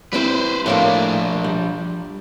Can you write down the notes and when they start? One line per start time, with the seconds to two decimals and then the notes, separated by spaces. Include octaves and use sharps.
0.13 G3 C4 E4 B4 C5
0.66 A2 F3 A3 A#3 D4
1.44 G3